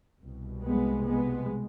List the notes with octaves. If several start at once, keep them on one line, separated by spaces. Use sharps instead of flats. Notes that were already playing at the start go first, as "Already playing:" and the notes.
C2 B2
G#3 B3
G#3 B3